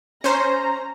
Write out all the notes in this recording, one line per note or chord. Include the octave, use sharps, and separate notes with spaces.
C#4 C5 A#5